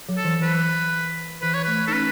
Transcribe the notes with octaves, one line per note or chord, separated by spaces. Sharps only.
F#3
A4
E3
E3 B4
E3 B4
C#5
A3 B4
D#4 A4
C#4 B4